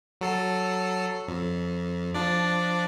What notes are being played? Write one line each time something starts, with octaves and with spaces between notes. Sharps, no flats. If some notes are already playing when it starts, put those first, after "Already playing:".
F#3 A4 C7
F2
F3 D4 D5